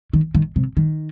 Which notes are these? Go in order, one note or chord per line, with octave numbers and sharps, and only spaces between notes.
D#3
D#3
C3
D#3